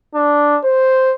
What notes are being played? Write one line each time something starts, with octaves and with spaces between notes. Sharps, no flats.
D4
C5